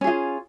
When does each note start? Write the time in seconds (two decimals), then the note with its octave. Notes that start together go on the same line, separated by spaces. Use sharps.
0.01 C#4
0.04 G#4
0.07 F4